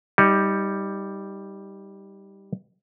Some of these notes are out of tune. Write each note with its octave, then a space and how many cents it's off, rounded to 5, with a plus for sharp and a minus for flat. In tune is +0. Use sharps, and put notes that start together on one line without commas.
G3 +0 D#4 +25